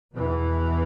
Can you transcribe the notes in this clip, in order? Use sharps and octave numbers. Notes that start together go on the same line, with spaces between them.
E2 B2 E3